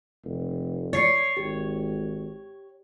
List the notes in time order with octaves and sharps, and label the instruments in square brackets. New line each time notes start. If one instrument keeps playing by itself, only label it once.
[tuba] F1
[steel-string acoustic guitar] C#5 [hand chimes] A6 C7 C#7
[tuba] G#1 [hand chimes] G4